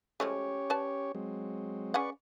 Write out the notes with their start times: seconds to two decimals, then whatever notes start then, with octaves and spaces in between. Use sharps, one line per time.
0.20 F3 G#3 A3 C#4 G4 C#5
0.70 B4 D5 A5
1.15 F#3 G#3 C4
1.94 C#4 G#4 B4 D5 F#5 C#6